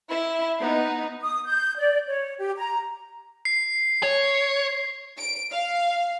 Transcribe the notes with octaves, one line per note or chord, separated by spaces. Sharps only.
E4
B3 D#4
D#6
G6
D5
C#5
G4
A#5
C7
C#5
D7
F5